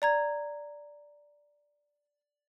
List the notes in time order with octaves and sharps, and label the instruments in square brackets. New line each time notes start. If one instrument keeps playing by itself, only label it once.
[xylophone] D5 A#5 G#6